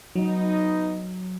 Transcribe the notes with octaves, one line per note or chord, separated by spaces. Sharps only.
F#3 B3 D#4